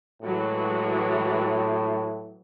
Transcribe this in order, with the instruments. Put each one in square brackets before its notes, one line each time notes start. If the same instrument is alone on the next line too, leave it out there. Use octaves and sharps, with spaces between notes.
[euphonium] A2 [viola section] E3 F#3 G#3